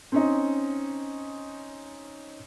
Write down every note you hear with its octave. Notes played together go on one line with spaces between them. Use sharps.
C4 C#4 D#4